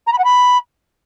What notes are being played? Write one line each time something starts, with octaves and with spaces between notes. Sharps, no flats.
A#5
B5
F#5
B5